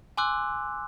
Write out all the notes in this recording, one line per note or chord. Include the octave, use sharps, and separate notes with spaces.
G#5 C6 D6 E6 F#6